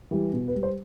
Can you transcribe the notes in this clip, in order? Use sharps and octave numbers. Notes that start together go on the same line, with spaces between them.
E3 G3
B2
B4
G3
C5